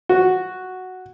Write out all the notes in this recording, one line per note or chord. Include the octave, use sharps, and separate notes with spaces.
F#4